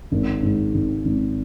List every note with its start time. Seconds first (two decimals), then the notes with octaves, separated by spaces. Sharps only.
0.12 G#1
0.43 G#2
0.74 G#1
1.05 G#1